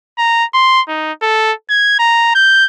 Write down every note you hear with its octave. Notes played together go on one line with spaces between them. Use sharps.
A#5
C6
D#4
A4
G#6
A#5
G6